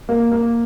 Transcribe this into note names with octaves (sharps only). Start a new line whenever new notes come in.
A#3
A#3